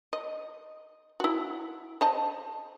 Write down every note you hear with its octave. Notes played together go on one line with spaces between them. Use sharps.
D#5
E4 F#4
C5 D#5 A5